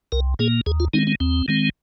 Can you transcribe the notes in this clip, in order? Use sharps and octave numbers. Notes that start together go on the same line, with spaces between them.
C2 A#4
A#2 A#3 G#4
D#2 G#4
F4
D#3 G#3 C4 D#4
C4
D#2 C4
D#3 G#3 C4